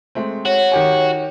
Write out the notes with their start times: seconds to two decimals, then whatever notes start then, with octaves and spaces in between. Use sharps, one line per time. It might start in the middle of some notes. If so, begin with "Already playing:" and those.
0.15 G#3 A3 C4
0.45 F#4 C#5
0.72 D#3 G4 G#5